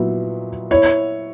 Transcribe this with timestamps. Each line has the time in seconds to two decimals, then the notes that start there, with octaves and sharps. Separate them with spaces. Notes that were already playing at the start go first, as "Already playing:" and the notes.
Already playing: A#2 F#3 B3 E4
0.71 E4 C#5